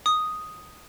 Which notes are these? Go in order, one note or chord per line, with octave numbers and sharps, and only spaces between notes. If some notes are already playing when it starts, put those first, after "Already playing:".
D#6